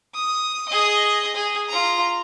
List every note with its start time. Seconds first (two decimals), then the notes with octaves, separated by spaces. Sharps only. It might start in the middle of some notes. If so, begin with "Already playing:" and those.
0.14 D#6
0.69 G#4 D#5
1.35 G#4
1.69 F4 A#5